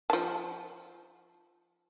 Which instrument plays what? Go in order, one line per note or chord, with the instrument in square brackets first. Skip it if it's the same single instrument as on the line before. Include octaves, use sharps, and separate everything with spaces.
[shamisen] F3 A5